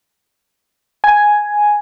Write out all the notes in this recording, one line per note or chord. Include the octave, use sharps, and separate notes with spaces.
G#5